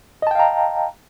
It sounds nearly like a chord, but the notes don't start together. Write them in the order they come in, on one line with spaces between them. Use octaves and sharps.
D#5 A5 G5 F5 A#5